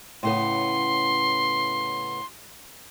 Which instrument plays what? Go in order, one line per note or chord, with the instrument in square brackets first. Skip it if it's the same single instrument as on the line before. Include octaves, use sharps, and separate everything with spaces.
[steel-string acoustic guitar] A2 C#3 B3 [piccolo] C6